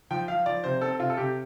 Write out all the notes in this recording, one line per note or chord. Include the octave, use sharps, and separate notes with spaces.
F3 G5
F3 F5
F3 D5
C3 C5
C4 A4
C3 F4
A4
C3 G4